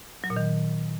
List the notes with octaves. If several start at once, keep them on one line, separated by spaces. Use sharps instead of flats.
F#3
A#2
D#3